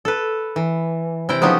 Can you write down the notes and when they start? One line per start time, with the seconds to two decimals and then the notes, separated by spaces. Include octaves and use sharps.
0.05 A4 B4
0.56 E3
1.29 C3 E4 G5
1.41 C#3 F3 F#3 B3 D#4 G4